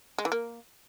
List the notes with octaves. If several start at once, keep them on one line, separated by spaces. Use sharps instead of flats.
G#3
E3
A#3